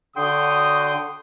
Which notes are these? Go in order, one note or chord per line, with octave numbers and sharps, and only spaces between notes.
D3 F#4 C#5 G5 C6 D#6